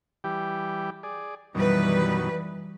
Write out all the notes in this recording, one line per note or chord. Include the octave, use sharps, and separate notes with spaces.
E3 G3 G4
G#4 D5
F#2 B2 D#3 E3 G3 B4